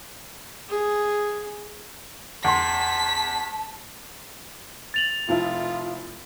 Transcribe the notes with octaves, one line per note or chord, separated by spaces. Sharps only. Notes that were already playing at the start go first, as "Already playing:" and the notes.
G#4
E2 A5 C6 B6
A6 F7 F#7
F1 F3 E4 F4